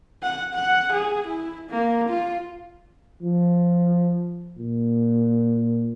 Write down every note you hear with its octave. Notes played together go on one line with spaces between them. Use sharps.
F#5
F#5
G#4
E4
A#3
F4
F3
A#2